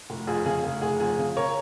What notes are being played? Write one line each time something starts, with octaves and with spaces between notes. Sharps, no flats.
F1
F2 G#4
C#3 G#4
F1
F1 G#4
F2 G#4
C#3
A#4 C#5